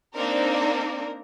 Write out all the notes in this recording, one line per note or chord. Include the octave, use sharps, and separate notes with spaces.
A#3 C4 D4 D#4 A#4